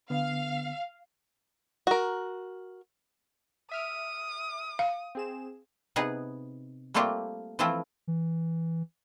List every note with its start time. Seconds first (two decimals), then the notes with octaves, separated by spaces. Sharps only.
0.10 D3 B3 F5
1.87 F#4 A#4
3.71 E5 D#6 F6 D7
4.79 F5
5.15 C4 G#4 E7
5.96 C3 B3 D#4 G#4 B4
6.94 G3 A3 A#3 C4 F4 G4
7.59 E3 F3 A3 C4 E4 F4
8.08 E3